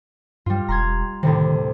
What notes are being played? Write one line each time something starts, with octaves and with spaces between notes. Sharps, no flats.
G2 G3 F4
E1 A#5 C6 G#6
D2 A2 C3 D#3